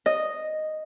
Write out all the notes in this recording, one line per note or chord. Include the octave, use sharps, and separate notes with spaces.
D#5